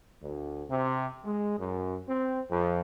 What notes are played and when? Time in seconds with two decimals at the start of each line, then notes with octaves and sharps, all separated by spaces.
0.22 D2
0.70 C3
1.25 G#3
1.59 F#2
2.09 C4
2.50 F2